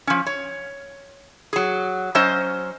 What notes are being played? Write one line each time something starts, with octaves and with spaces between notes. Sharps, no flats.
F3 C#4
C#5
F#3 G#4
F#3 C#4 C5 D#5